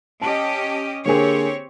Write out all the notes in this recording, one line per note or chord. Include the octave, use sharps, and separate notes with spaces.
C#4 G4 D#5 A5
D3 A#3 C4 G4 G#4 C#5